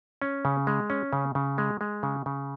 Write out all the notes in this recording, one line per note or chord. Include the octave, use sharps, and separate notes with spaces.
C#4
C#3
G#3
C#4
C#3
C#3
G#3
G#3
C#3
C#3